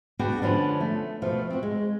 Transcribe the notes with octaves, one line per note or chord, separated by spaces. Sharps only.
B3 D4 F#4 G#4 F#5 G5
D3 F3 B3 C#4 D4
A3
B2 F3 A3
C4 F#4
G#3